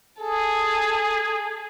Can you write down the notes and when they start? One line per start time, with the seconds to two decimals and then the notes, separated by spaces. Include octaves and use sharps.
0.20 G#4 A4